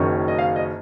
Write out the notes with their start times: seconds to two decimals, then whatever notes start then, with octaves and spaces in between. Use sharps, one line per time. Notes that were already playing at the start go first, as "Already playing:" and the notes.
Already playing: F#1 F#2 D#3 F#3 C#4
0.28 D#5
0.39 F5
0.56 D#5